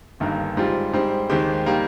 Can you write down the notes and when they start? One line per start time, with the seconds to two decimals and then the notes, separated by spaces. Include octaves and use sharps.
0.20 G1 G2 D#3 A#3
0.57 G#2 G3 C4 F4
0.93 G#2 G3 C4
1.29 D#2 D#3 G#3 C4 G4
1.66 D#3 G3 A#3